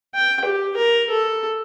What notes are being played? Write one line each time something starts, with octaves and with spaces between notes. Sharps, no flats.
G5
G4
A#4
A4